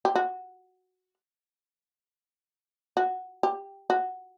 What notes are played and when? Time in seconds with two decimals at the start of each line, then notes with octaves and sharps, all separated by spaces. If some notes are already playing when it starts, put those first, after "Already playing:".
0.05 G4
0.16 F#4
2.97 F#4
3.43 G4
3.90 F#4